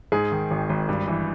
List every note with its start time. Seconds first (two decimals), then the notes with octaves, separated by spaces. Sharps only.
0.12 G#2 G#4
0.32 D#3
0.51 G#1
0.70 G#1
0.89 G2
1.08 E3